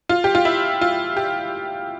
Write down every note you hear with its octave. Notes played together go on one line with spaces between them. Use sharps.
F4
G4
F4
E4
F4
G4